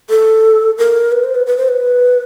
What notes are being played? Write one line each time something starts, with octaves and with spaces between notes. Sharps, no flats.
A4
A#4
B4
C5
B4
B4
C5
B4